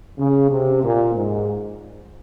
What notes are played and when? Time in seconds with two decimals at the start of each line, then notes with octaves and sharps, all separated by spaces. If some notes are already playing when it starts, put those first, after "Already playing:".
0.18 C#3
0.50 C3
0.84 A#2
1.15 G#2